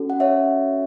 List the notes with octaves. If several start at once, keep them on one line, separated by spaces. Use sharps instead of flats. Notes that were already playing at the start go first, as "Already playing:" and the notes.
Already playing: C#4 F#4 A4
F#5
C#5 E5